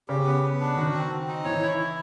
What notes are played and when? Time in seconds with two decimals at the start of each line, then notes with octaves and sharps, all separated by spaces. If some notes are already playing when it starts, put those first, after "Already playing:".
0.08 C#3 G4
0.25 B3
0.43 B3
0.60 D4
0.77 D#3 F#4
0.94 C4
1.11 C4
1.28 D#4
1.44 E3 C#5
1.62 E4
1.79 E4